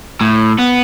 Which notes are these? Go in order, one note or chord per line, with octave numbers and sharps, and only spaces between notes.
A2
B3